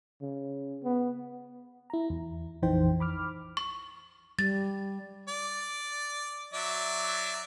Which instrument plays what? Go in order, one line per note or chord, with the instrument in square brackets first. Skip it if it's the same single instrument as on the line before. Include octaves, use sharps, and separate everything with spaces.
[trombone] C#3
B3
[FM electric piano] E4 A#5
E2
A#1 F2 E3 D#4 C5 G5
B5 D6 F6
[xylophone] C#6
[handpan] G3 [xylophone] A6
[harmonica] D5
F#3 D5 E5